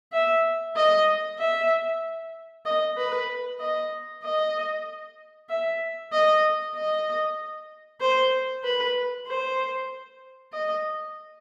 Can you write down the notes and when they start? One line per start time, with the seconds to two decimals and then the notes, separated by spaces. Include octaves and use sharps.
0.12 E5
0.76 D#5
1.39 E5
2.66 D#5
2.97 B4
3.60 D#5
4.23 D#5
5.49 E5
6.12 D#5
6.75 D#5
8.01 C5
8.64 B4
9.28 C5
10.53 D#5